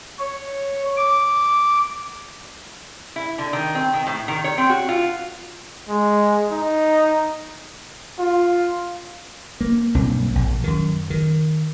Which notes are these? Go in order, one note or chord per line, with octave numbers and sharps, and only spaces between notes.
C#5
D6
E4
D3
D#3
C4
D#3
A2
D#3
C#5
C4
F#4
F4
G#3
D#4
F4
A#3
B1 G2 A#3 C4
A#1
F#2 D#3
D#3